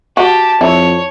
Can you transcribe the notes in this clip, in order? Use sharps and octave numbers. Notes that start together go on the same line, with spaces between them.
F#4 G4 A5
F2 E4 C#5